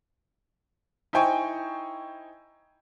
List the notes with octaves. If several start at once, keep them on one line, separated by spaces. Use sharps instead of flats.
D#4 E4 C5 G5 G#5 C#6